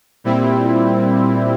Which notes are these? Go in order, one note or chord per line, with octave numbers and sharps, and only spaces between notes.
A#2 G3 C4 E4